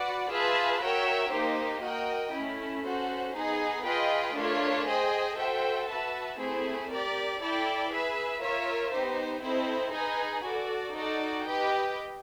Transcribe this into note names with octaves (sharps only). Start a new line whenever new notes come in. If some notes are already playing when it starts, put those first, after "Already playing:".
Already playing: F#4 B4 D5 F#5
F4 G#4 B4 E5 A5
F#4 A#4 C#5 E5 G5
A#3 D#4 G4 C5
F#4 A#4 D#5 G5
A3 C#4 E4
C#4 F#4 A4 C5
B3 D#4 G#4
F4 G#4 B4 D#5 G5
A3 D4 F4 A#4 C#5
G#4 C5 D#5 G5
F#4 A4 C5 E5 G5
F#4 B4 E5 A5
A3 C4 E4 G#4 C5
G4 A#4 D5
E4 A4 D5 G5
G#4 B4 E5
F4 A#4 C#5 E5
B3 D#4 G4 C5
C4 E4 A4 C5 D#5
D#4 G#4 B4 D#5 G#5
F#4 A4 D5
D#4 F#4 A4 D5
G4 B4 D#5 G5